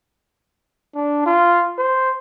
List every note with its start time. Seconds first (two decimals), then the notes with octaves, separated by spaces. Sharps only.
0.95 D4
1.26 F4
1.78 C5